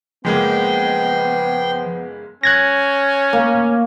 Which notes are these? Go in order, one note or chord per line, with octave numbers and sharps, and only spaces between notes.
F#1 F3 G#3 A#3 B3 G5 C6
C#4 F#6 G#6 A#6
A#3